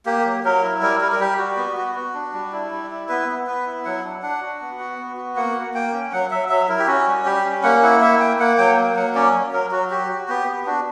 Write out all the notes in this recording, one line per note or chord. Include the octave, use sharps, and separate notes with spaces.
A#3 G4
F#3
F#3 A#4
E4
G3 A#4
G3 A#4
A#4
G3 G4
F#4
B3
F#4
F#4
D4
G3
E4
G3
E4
B3 B4
B3
B3 B4
E4
F#3 F#5
D4
D4 F#5
F#4
B3
F#4
B3
F#4
A#3 F#5
A#3
A#3 G5
C#4
F#3 F#5
F#3 E5
F#3 E5
E4 A#4
G4
C#4 F#4
G3
G3 G4
C#4
A#3 F#5
E4 F#5
A#3 E5
A#3 G5
A#3 F#5
F#3 G5
A#3
F#3 F#5
C#4 D5
F#3
F#3 A#4
F#3 F#4
F#4 G4
F#4
B3 G4
B3
D4 F#4